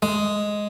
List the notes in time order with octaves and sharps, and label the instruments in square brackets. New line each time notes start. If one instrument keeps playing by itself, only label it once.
[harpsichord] G#3